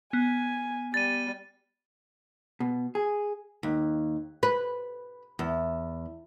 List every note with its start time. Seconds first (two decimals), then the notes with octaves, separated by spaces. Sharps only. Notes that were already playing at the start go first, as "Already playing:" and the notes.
0.13 B3 G#5
0.94 G3 A6 D#7
2.60 B2
2.95 G#4
3.63 D#2
4.43 B4
5.39 E2